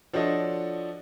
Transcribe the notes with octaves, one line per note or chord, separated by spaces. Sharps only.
F3 D4 F#4 A4 C#5 D#5